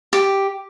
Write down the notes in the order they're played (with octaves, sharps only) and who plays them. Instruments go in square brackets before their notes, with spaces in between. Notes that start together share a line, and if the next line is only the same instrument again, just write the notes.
[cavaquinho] G4